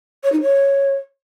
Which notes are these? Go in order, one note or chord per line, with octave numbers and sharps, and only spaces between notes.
C#5
D#4
C#5